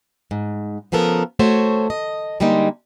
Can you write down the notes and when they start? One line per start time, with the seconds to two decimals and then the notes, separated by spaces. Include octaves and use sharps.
0.31 G#2
0.92 C#3 F3 B3 A4 A#4
1.39 A3 F#4 C5 C#5
1.90 D#5
2.40 D3 G3 G#3 A#3 D#4